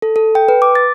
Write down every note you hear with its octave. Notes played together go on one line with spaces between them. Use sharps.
A4
A4
G5
B4
D6
A6